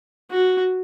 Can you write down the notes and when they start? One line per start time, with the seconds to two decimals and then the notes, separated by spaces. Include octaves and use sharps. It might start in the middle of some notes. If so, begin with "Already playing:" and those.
0.31 F#4